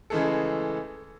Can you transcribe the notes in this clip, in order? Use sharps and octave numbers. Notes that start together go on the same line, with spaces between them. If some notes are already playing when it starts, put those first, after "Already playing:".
C#3 E3 G#3 A3 G#4 A4